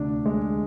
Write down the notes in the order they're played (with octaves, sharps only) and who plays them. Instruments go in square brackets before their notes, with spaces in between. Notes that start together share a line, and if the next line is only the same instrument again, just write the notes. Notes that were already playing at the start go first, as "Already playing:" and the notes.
Already playing: [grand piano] D2 C3 D4
G#3